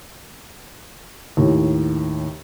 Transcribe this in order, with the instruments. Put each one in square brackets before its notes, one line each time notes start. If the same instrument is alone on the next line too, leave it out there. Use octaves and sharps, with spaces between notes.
[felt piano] D#2 A2